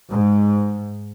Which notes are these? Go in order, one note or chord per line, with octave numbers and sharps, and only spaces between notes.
G#2